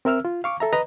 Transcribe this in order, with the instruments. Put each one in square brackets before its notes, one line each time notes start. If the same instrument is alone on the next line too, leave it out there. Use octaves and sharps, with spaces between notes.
[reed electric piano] C4 A#4 E5 E6 F6
F4
F5 C#6 D6
A4 E5 A#5
B4 D#5 A#5